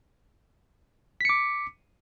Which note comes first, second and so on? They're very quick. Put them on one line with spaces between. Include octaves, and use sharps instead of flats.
B6 C#7 D6